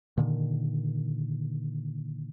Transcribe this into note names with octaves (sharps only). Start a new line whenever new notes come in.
A#2 D3 D#3